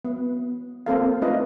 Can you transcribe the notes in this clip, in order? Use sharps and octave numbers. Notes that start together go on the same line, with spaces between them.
B3
A#3 C4 A4 F5
A3 D4 F4 B4 D#5